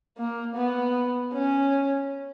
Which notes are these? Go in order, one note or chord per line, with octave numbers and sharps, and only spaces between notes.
A#3
B3
C#4